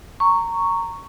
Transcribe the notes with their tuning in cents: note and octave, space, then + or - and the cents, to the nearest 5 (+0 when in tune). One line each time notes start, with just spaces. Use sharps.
A#5 -15 C#6 +0